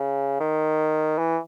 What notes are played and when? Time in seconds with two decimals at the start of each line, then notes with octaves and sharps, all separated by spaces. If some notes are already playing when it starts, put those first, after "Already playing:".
Already playing: C#3
0.40 D#3
1.18 E3